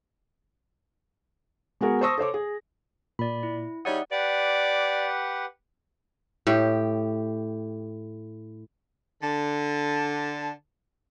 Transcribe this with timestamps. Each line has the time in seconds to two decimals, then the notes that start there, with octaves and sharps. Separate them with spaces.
1.81 G#3 B3 F#4 G#4 A#4
2.01 C5 A5 C#6 D#6 E6 A#6
2.18 A4 C5 C#5 D6
2.34 G#4
3.19 A#2 D5 B5
3.43 E4
3.85 G3 D#4 G#4 C#5 D5 E5 F#5 D#6
4.12 G4 B4 D5 F#5
6.47 A2 G4
9.23 D3 A5